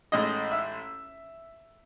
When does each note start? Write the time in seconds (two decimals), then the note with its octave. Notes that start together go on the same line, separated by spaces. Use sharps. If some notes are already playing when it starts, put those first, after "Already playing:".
0.12 A1 A2 G#3 D#5
0.52 E5